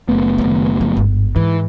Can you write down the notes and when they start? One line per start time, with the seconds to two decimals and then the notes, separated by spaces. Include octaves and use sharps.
0.09 F#1 A3 B3
0.38 D#3 A#3
0.81 F3
0.97 G1 G#2
1.36 G#2 E3